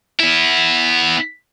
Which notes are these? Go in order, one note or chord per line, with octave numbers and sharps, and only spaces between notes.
B3 E4